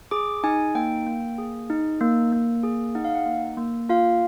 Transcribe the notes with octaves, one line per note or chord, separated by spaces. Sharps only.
G#4 D6
D#4 G#5
A#3 G5
A#3
G#4
D#4
A#3
A#3
G#4
D#4 F#5
F5
F#5
A#3
A#3
F4 F5